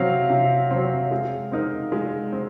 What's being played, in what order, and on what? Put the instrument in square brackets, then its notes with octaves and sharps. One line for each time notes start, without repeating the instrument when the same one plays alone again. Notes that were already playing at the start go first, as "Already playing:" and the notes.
Already playing: [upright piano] C3 F#3 C4 [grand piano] F5
[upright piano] C3
F#3 C4
G#3
C4 D#4 A#4
G#3
C4